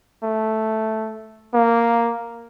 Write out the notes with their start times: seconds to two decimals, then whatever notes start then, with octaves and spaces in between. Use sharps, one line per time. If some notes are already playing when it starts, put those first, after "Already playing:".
0.23 A3
1.54 A#3